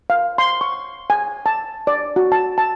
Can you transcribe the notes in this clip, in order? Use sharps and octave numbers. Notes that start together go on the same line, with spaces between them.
F5
C6
C#6
G#5
A5
D5
F#4
A5
A5